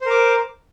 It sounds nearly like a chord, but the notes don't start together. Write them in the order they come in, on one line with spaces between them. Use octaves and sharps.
C5 A#4 D6